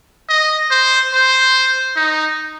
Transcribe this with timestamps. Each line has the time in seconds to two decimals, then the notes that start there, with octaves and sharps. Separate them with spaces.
0.29 D#5
0.71 C5
1.13 C5
1.96 D#4